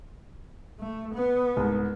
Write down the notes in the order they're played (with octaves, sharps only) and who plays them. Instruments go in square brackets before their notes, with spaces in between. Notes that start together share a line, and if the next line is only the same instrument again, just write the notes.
[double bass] A3
B3
[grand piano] C2 G#2